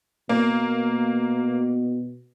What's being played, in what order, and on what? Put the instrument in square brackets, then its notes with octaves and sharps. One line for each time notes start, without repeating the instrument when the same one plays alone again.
[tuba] B2 [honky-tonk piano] A#3